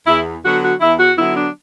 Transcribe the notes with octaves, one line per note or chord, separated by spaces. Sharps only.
E2 E4
D3 F#3 B3 F#4
F#4
E2 E4
F#4
D3 F#3 B3 E4
D4